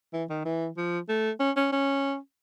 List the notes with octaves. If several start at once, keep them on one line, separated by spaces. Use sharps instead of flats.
E3
D#3
E3
F3
A3
C#4
C#4
C#4